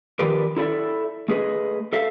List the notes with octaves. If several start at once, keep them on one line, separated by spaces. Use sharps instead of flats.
D#3 F3 G4 A#4 B4 D5
E4 A4 D5 E5
A3 G#4 B4 D#5
A4 E5 F5